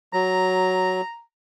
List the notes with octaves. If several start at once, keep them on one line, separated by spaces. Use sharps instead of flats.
F#3 A#5